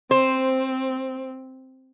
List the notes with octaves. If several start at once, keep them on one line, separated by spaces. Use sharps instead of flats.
C4 C5